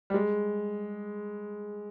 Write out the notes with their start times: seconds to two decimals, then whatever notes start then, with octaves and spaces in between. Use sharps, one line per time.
0.10 G3
0.14 G#3